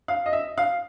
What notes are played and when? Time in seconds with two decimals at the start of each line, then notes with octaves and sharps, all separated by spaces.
0.08 F5
0.26 D#5
0.33 E5
0.58 F5